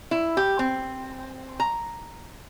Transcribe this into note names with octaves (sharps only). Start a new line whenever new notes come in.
E4
G4
C4
A#5